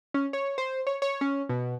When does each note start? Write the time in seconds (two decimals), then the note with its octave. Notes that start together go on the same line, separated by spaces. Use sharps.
0.14 C#4
0.33 C#5
0.58 C5
0.87 C#5
1.02 C#5
1.21 C#4
1.49 B2